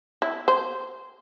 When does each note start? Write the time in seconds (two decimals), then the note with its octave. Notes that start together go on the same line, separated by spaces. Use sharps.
0.22 E4
0.48 C5